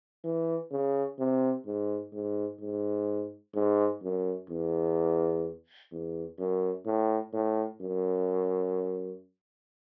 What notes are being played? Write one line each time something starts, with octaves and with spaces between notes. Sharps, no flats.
E3
C#3
C3
G#2
G#2
G#2
G#2
F#2
E2
E2
F#2
A2
A2
F#2